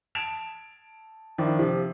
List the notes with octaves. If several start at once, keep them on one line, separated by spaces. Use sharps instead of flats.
A5 G#6 D7 E7 F7
D#3 F3 D4 E4
C3 F3